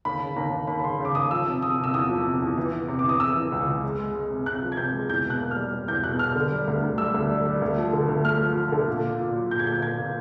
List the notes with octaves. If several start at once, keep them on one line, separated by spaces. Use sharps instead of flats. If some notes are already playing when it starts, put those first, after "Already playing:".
D#2 B5
C#3
D#2 A#5
D#2
D#2 B5
B5
C#3 C6
C#3 D6
D#2 D#6
F3 E6
C3
C3 D#6
C3
E6
E2 D#6
F3
C3
E2
E3
E3
C3
D6
E3
D#6
C3 E6
E3
C#2
C#2
G#3
G#3
G#3
C3
C3 F#6
F3
G#6
C3 G6
G#3
E2 G6
B2
F#6
A#3
F6
G3
G3
E2 G6
B2 F#6
B2 F6
D3
G3
D2
D2
G3 E6
D2
G3
G3
D2
F3
D3
D2
A3 F6
F3
F3
D3
A#2
A#2
A#2
F#3
A#2 G6
G#6
A#2 G6
A#2 G#6
A#2